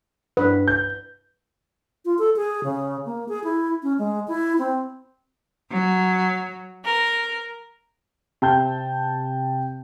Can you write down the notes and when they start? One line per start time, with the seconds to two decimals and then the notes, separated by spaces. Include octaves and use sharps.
0.37 G2 B4
0.68 G6
2.05 F4
2.19 A4
2.36 G#4
2.64 C#3
3.05 A#3
3.29 G#4
3.44 E4
3.83 C#4
3.99 G#3
4.28 E4
4.58 C4
5.70 F#3
6.83 A#4
8.42 C3 G5 A5 G6